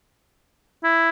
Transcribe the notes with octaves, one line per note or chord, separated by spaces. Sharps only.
E4